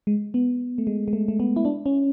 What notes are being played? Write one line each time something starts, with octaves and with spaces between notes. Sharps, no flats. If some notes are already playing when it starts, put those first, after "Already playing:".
G#3
B3
A3
G#3
G#3
A3
A3
B3
E4
D4
C#4